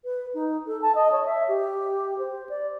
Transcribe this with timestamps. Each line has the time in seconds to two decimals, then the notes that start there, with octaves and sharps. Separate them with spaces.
0.04 B4
0.34 D#4
0.67 A4
0.82 A5
0.95 D#5
1.12 C#5
1.26 E5
1.48 G4
2.19 C5
2.49 D5